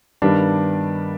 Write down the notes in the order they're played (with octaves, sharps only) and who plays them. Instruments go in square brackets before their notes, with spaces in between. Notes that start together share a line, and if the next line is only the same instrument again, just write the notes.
[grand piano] G2 D#3 G3 B3 D4